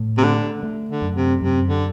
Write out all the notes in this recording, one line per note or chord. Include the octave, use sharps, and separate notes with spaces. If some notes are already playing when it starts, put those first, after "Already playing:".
Already playing: A2
C3
D3 A3
A3
D3
F#2
C3
F#2 C3
D3